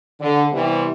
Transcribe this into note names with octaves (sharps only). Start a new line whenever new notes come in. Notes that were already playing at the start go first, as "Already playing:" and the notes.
D3
C3 E3 G3 B3 C4 E4